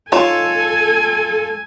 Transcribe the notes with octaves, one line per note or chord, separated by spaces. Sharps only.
D#4 F4 A4 C#5 G#5 A5